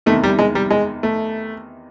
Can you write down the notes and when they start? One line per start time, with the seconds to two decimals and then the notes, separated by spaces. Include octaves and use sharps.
0.06 E2 C3 D#3 A3
0.24 G3
0.39 G#3
0.55 G3
0.71 G#3
1.03 A3